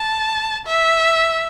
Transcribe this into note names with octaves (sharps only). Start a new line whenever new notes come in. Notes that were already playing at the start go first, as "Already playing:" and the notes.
Already playing: A5
E5